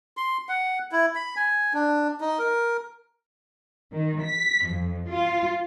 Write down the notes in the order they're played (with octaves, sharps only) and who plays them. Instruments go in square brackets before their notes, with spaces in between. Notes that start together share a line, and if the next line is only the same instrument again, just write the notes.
[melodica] C6
F#5
E4
B5
G#5
D4
D#4
A#4
[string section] D#3
B6
F2
F4